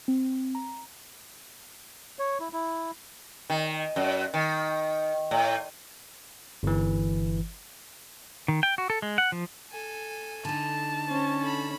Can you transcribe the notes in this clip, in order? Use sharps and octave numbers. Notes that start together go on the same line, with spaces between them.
C4
A#5
C#5
E4
E4
D#3
F#2
D#3
A2
G1 E3
D#3
G5
F#4
A4
G#3
F#5
F3
A4 G#5
D3 D#4 A5
C#4 C5
A4 B5